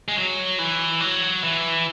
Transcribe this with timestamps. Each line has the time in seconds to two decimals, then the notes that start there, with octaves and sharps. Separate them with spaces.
0.08 G#3
0.17 F#3
0.59 E3
1.00 F#3
1.44 E3